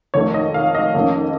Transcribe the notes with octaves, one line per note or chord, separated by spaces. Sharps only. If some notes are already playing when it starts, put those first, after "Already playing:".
F2 D#3 A3 C#5
D#5
F5
D#5
F2 D#3 A#3 C#4